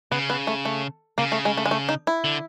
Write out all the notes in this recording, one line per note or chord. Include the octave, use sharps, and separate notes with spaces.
C#3 B3
B3
A3
A3
C#3 A#3
A3
G#3
A3
G#3
A3
D#4
E4
D3